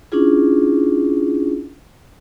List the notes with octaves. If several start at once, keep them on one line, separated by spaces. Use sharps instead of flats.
C#4 D4 E4 F4 G#4